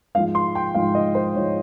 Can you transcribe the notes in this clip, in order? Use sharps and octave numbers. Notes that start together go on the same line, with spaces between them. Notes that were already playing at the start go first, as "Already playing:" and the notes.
G#2 F3 G#3 F5
C6
G5
G#2 F3 G#3 F5
D#5
C5
G#2 F3 G#3 C#5